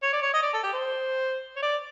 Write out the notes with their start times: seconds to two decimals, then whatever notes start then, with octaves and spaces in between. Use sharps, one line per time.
0.02 C#5
0.13 D5
0.22 C#5
0.34 D#5
0.43 D5
0.53 A4
0.63 G4
0.73 C5
1.56 C#5
1.62 D5